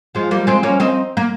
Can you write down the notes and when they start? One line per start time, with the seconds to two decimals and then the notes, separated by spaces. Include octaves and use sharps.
0.15 F3 G#3
0.31 G3 A#3
0.47 G#3 C4
0.63 A#3 C#4
0.80 C4 D#4
1.17 A#3